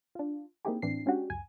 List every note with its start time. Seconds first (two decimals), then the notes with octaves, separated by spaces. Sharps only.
0.15 D4 F4
0.65 A#3 C4 D#4 E4 G4 G#4
0.82 A2 E3 C4 D4 C7
1.06 G#3 C#4 D4 F#4 G4
1.30 C#2 F#2 G#5